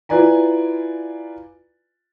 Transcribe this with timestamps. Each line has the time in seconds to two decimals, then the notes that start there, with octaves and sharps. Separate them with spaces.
0.09 E4 F4 B4 D5 G#5 A#5